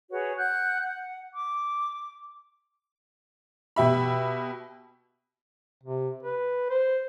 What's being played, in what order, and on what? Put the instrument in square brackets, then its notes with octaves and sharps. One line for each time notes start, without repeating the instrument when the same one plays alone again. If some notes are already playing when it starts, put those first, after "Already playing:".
[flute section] F#4 G#4 B4 C#5
F#5 F#6 G6
F#5
D6
[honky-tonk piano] B2 G4 E5 B5
[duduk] C3
B4
C5